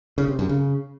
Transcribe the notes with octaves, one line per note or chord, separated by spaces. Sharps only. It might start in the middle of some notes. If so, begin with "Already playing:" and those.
C#3
C3
F#2
C#3